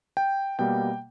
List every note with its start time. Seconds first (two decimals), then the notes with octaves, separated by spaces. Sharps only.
0.17 G5
0.59 B2 G3 A#3 G5